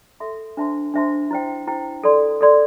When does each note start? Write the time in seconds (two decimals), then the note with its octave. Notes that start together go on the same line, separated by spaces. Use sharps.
0.20 A4 E5 C6
0.57 D4 C5 E5 A5 C6
0.94 D4 C5 E5 A5 C6
1.31 E4 C5 G5
1.67 E4 C5 G5
2.04 A4 D5 C6
2.41 A4 D5 C6